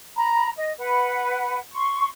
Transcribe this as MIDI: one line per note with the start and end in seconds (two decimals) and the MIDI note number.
0.16 0.48 82
0.16 0.48 83
0.56 0.72 75
0.78 1.57 71
0.78 1.57 78
1.74 2.06 84
1.74 2.06 85